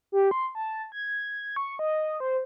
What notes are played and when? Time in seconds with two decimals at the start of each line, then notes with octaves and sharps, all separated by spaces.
0.12 G4
0.31 C6
0.55 A5
0.92 G#6
1.56 C#6
1.79 D#5
2.20 C5